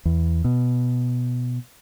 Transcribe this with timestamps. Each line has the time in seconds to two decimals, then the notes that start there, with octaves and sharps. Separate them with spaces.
0.05 E2
0.44 B2